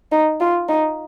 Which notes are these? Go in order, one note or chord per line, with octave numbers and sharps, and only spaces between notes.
D#4
F4
D#4